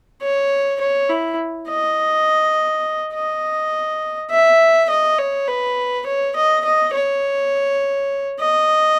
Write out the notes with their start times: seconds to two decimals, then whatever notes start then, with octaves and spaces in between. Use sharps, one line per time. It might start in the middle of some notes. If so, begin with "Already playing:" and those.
0.22 C#5
0.81 C#5
1.10 E4
1.69 D#5
3.14 D#5
4.31 E5
4.90 D#5
5.19 C#5
5.48 B4
6.07 C#5
6.36 D#5
6.65 D#5
6.94 C#5
8.40 D#5